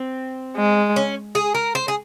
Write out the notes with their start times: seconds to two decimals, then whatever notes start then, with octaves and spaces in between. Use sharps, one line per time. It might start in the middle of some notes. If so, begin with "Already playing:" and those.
Already playing: C4
0.57 G#3
0.96 C#4
1.35 G#4
1.55 A#4
1.75 C5
1.88 G#4